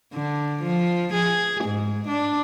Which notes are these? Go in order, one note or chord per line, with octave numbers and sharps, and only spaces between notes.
D3
F3
G#4
G#2
D4